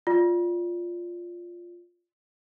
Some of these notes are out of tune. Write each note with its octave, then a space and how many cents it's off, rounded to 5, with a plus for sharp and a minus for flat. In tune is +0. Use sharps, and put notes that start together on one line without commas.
F4 +0 D5 +0